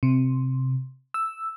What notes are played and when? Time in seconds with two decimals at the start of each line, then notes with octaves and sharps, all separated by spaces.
0.03 C3
1.14 E6